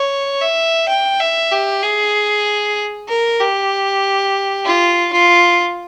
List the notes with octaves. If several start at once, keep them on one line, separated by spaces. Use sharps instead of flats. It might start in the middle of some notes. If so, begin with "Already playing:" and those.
Already playing: C#5
E5
G5
E5
G4
G#4
A#4
G4
F4
F4